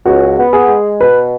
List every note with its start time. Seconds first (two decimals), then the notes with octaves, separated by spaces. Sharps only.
0.05 C#2 F#4
0.38 B3
0.53 G#4
0.68 G#3
1.01 B2 B4